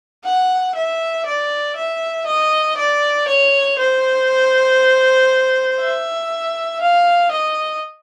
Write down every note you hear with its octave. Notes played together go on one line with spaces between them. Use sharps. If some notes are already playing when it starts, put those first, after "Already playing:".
F#5
E5
D5
E5
D#5
D5
C#5
C5
E5
F5
D#5